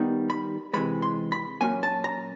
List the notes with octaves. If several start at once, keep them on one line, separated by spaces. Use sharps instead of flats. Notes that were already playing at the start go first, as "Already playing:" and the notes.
Already playing: D#3 G3 B3 D#4
B5
C3 E3 G#3 B5
C6
B5
A#2 F#3 A#3 C#4 G#5
A5
A#5